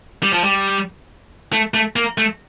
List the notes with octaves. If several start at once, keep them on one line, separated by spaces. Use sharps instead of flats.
G3
F3
G3
A3
A3
A#3
A3